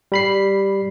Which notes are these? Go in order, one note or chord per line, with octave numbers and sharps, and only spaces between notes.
G3 B5 C7